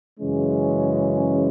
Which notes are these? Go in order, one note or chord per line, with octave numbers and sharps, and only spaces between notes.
F#2 C#3 E3 G#3 C#4